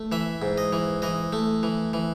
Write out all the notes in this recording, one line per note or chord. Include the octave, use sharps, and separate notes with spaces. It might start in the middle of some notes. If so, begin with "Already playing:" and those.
Already playing: A3
E3 E5
G#2
D#5
E3
E3 D#5
A3
E3
E3